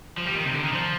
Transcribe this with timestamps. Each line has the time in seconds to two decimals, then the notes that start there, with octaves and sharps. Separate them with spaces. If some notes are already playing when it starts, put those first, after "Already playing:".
0.18 F3
0.26 G3
0.35 D#3
0.45 C3
0.54 D3
0.63 D#3
0.73 F3